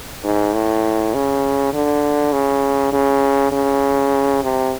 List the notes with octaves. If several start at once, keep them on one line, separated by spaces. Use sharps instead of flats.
G#2
A2
C#3
D3
C#3
C#3
C#3
C3